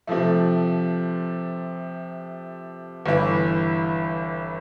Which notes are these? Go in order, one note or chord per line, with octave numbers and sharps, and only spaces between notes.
C3 F3 A3
G1 G2 E3